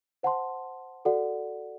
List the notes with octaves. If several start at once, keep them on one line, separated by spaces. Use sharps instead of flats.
C5 F#5 A5 C6
F#4 A4 D5 F#5